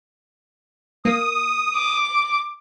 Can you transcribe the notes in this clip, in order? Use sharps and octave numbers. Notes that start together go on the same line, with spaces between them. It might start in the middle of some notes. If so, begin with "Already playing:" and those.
A#3 D#6
D6